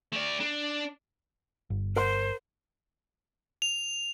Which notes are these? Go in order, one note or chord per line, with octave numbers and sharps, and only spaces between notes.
A3 D5
D4
G1
A#4 C5 F#5 C6
F7